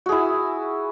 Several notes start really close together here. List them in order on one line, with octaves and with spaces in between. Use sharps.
F#4 G#4 E4